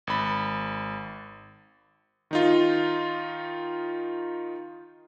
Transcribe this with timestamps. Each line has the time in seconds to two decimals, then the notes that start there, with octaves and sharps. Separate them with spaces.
0.07 G#1 B5
2.31 D#3 D#4 F4